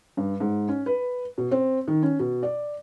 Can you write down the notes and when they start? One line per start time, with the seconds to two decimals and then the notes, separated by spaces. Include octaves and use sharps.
0.17 G2
0.40 G#2
0.68 C#4
0.86 B4
1.38 B2
1.51 C4
1.88 D#3
2.03 C#4
2.19 B2
2.43 D5